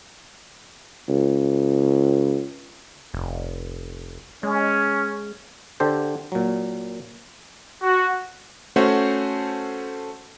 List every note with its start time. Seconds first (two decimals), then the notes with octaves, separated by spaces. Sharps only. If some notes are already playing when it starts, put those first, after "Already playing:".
1.09 C#2
3.14 F1
4.43 G#3 C#4
5.80 D3 G4 A4 C5
6.32 A#2 F#3
7.82 F#4
8.76 A3 C#4 F#4 C5 E5 F#5